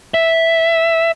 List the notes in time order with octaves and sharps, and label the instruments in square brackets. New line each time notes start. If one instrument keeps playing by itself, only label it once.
[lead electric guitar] E5